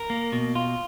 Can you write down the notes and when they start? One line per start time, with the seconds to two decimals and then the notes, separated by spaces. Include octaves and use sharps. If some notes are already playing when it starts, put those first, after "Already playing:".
Already playing: A#4
0.10 A#3
0.32 B2
0.55 F4